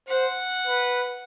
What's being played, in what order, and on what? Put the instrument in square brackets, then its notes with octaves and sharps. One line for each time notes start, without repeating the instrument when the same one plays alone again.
[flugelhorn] C5 [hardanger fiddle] F#5
[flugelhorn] B4